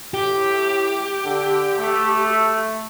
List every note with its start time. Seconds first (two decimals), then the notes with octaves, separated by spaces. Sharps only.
0.14 A2 G4
1.25 D3
1.78 A3